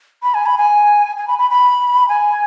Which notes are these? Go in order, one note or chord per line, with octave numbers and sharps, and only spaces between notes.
B5
G#5
B5
G#5
G#5
B5
B5
B5
G#5